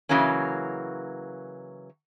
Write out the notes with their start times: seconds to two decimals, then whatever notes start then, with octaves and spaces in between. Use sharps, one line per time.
0.09 C#3 E3 F#3 A#3 C#4